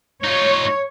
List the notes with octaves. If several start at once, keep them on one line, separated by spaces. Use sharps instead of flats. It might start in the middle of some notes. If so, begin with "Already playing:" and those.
D#4 F4 C#5